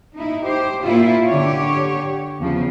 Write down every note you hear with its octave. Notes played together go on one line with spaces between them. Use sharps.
D#4 E4
G4 C5
A#2 E4 F4
D3 G4 C#5
E2 C#3 F3